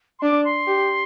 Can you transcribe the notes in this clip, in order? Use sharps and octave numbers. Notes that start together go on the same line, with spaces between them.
C6
D4 D6
C6
G4